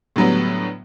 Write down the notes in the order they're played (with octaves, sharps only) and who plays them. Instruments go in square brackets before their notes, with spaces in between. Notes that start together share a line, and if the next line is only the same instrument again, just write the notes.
[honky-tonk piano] A2 D3 F#3 G3 B3